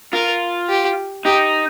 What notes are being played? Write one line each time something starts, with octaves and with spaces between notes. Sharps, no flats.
F4 A#4
G4
D#4 G4